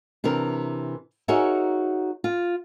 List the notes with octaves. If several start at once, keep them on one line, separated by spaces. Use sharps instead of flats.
C3 E3 D4 A#4
D#4 F#4 G#4 A#4 C#5 E5
F4